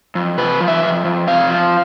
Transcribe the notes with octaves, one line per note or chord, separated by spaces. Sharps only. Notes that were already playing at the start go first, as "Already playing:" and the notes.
F2
C3 B4
F3
E5
F2
F2
C3 F5
F3